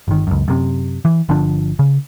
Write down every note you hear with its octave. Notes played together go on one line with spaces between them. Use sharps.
G1 D#3
C#2 F#2
F#2 C3
E3
G1 D3 F3 D4
C#3